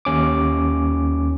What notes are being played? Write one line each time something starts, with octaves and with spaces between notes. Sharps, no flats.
D#2 C#4 D6